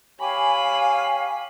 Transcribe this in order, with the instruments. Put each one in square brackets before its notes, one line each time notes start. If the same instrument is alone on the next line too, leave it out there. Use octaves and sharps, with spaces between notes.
[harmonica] G4 C#5 [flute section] F5 G#5 [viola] B5